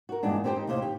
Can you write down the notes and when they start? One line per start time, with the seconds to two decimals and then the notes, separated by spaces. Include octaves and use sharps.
0.09 F#4 A#4
0.23 E2 G2 A#2 G#3 D4
0.44 C4 D4 G4 B4 C5
0.56 D#4
0.67 D#2 A2 C3 C5 F5
0.82 G4